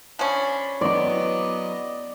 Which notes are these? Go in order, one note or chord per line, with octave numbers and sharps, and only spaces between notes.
F3 C#4 D4 B5
F#3 B3 D5 D#5 D6